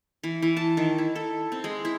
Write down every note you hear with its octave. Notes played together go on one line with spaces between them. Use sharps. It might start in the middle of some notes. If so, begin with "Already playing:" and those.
E3
E3
A5
D#3
E4
A4
C4
G#3
E4